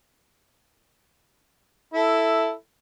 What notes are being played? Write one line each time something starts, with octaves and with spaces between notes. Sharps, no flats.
E4 A4